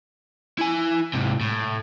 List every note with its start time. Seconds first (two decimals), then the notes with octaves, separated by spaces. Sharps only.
0.58 E4 G#5
1.13 G#2 C3
1.41 A2